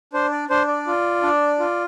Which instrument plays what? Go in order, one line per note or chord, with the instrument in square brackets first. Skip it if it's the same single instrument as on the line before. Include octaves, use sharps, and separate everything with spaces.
[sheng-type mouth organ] D4 C5
D5
D4 C5
D5
F4
D4
F4